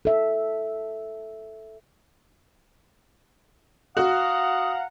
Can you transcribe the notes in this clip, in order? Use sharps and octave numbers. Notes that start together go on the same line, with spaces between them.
A4 E5
F#4 F5 F#5 A#5 D#6